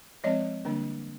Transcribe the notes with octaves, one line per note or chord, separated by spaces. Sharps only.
F3 G#3 C4 C#5 D#5
D3 G3 A#3 D4